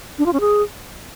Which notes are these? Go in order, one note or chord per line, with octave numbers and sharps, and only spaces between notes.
D4
F4
C#4
G#4